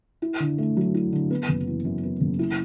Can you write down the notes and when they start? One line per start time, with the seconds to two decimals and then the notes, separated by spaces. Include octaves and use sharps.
0.22 E4
0.40 D3
0.58 A3
0.77 F#3
0.94 E4
1.13 D3
1.31 B3
1.49 F#1
1.67 E3
1.85 F#2
2.03 B3
2.20 F#1
2.39 E4